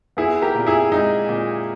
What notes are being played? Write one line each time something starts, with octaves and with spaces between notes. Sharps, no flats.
B3 E4 G#4
G4 A#4
A#2
E4 G#4
G#3 D#4
A#2